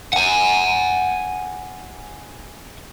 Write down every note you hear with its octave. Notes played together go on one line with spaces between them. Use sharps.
F#5 G#5